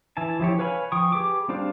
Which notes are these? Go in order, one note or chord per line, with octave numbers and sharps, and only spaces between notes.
E3 E5 G#5 A5
F3 E4 G4 C#5
B4 C#5 F5 G#5 B5
F3 G5 C#6 D#6
G4 G#4 B4 D6
G3 C4 D4 F4 C5